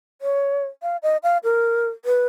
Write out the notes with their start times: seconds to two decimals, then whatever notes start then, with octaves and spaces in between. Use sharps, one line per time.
0.22 C#5
0.83 F5
1.03 D#5
1.23 F5
1.44 A#4
2.05 B4